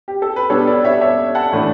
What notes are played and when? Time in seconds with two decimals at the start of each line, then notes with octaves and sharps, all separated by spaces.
0.08 G4
0.22 A4
0.36 B4
0.50 B2 G3 D4 A4 C#5
0.67 B4 D5
0.85 C#5 E5
1.01 C#5 E5
1.35 F#5 A5
1.53 A2 E3 A3 D4